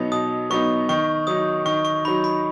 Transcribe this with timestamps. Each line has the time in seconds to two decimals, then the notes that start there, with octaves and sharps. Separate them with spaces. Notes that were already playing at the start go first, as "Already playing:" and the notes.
Already playing: B2 F#3 B3 D#4
0.12 B2 D#6
0.50 F#3 B3 D#4 C#6
0.89 D#3 C#6
1.27 F#3 D#4 D#6
1.65 D#3 C#6
1.85 C#6
2.05 F#3 D#4 B5
2.24 B5